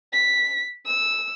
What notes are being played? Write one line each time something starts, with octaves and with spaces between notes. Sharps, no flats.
B6
E6